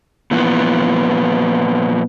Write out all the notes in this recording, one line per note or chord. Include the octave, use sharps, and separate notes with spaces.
A#2 E3 F3 B3